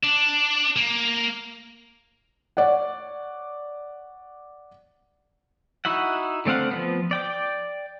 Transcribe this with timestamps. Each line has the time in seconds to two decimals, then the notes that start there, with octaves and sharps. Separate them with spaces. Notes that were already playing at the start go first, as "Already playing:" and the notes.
0.04 D4
0.76 A#3
2.57 C#5 D5 F#5
5.85 D#4 E4 F#4 E5 F#5
6.45 D3 A3 C4 F5 F#5
6.71 F3 G3 B3
7.11 D5 G5 D6